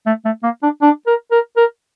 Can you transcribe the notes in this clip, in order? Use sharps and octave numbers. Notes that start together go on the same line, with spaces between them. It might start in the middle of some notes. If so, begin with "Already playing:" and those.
A3
A3
A#3
D4
D4
A#4
A#4
A#4